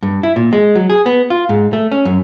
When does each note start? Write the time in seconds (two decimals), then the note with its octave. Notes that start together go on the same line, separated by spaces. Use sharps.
0.02 G2
0.23 E4
0.36 A#2
0.53 G#3
0.75 F#3
0.90 G#4
1.06 B3
1.30 F4
1.49 G#2
1.73 A3
1.92 C#4
2.05 F#2